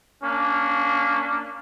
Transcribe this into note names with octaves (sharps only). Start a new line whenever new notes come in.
A#3 C#4 D4